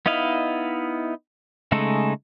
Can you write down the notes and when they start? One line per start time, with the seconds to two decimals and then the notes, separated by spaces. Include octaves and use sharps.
0.06 B3 D#4 E4 D#5 F5
1.72 C#3 G#3 A3 D#4 A4